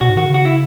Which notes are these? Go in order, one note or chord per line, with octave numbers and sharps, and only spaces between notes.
B2 F#4
G#2
D#3 F#4
C#3
F#4
E4